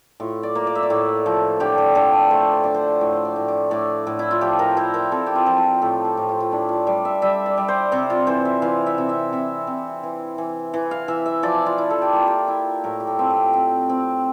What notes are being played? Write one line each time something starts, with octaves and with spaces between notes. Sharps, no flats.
A2 F4
D5
A#3
D5
E5
D5
A2
F3
D3 G4
G4
D3 A4
A3 C5
D5
C5
D4 D5
C5
A2
C5
D5
A2
D5
A2 D5
A2
E4
F4
F3 G4
A#4
E4 C5
A#4
C4 A4
G4
F4
F3
F4
A2 A4
G4
A2
F4
F4
D4 E4
F4
G3 D5
E5
G3 E5
D5
G3
C5
C3 C5
F4
E3 C5
E5
E3 F5
E5
C3
E5
C3 E5
C3
E3
E3
E3
F5
E3 E5
E5
F3 D5
F4
E4
A4
G4
A#3 F4
G4
E4
A2 A#4
G4
A4
C4 F4
G4
C4
C4